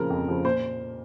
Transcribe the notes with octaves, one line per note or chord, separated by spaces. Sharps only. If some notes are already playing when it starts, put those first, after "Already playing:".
Already playing: C#3 F3 A#4
F2
C#3 F3
A#2 C5